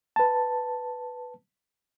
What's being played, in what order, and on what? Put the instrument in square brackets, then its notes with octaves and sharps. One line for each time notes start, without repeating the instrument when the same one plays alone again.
[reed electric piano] B4 A5